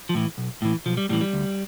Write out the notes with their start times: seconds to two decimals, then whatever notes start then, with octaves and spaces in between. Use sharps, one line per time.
0.09 F3
0.14 A2 E3
0.38 B1
0.62 A2 E3
0.86 B1 F3
0.97 G3
1.09 A2 G3
1.13 E3
1.21 G3
1.33 D2